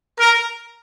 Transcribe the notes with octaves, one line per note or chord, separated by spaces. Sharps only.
A#4